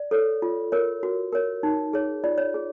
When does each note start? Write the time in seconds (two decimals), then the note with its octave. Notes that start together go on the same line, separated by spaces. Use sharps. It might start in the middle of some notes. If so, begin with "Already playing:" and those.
Already playing: D5
0.11 A4 C#5
0.42 F4
0.72 A#4 C#5
1.03 F#4
1.32 A#4 C#5
1.63 D#4
1.93 G#4 C#5
2.24 F4 D5
2.38 C#5
2.54 G#4